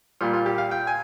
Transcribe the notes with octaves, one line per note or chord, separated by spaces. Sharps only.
A#2 G3 F4
F4
G4
F5
G5
G#5